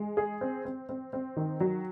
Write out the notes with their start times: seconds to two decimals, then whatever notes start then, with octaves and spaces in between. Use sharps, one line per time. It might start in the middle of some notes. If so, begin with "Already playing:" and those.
Already playing: G#3
0.17 G#4
0.41 C4
0.65 C4
0.89 C4
1.13 C4
1.36 D#3
1.60 F#3